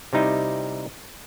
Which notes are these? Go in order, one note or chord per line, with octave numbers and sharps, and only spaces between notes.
C3 G3 D#4 E4